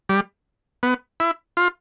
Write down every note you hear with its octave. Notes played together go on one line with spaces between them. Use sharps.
G3
B3
E4
F4